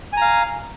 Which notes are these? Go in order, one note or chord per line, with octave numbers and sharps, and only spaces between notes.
F5 G#5 A#5